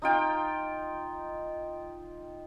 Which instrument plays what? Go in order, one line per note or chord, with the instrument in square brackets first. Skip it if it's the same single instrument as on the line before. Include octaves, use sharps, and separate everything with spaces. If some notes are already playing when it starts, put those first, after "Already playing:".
[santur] D#4 F4 G5